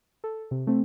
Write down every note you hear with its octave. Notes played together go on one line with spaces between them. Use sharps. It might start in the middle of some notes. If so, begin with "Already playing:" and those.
A4
C3
A3 C4